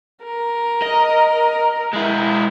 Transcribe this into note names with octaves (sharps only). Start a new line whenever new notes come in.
A#4
D#5
G#3 E4